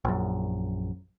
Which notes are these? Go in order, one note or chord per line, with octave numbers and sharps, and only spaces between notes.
A#1 F#2